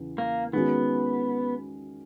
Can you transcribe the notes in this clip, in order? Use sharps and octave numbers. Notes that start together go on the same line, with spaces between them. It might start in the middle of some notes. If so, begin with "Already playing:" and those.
Already playing: E2 C#3
A#3
D#3 G#3 B3 C#4 F#4